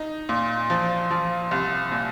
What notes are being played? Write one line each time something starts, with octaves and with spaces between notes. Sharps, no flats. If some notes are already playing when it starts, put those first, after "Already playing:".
Already playing: D#4
A#2
F3
F3
C2
A#2